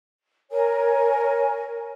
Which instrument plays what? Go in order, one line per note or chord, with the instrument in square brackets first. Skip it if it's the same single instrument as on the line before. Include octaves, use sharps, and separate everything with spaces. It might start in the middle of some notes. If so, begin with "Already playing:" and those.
[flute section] A#4 C#5 G#5